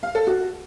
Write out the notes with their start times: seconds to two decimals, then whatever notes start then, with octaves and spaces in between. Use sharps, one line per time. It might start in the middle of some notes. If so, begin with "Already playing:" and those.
0.03 F5
0.15 A4
0.27 F#4